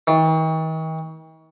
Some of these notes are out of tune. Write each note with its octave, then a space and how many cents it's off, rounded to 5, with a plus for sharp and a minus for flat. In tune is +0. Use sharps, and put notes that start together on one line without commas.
D#3 +45